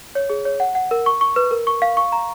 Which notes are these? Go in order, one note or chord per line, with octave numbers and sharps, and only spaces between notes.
C#5
G#4
C#5
F#5
F#5
A#4
C#6
C#6
B4
A#4
C#6
F5
C#6
A#5